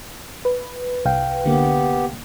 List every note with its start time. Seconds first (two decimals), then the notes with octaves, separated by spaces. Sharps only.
0.45 B4
1.05 C2 F5 G5
1.46 D3 A#3 B3 G4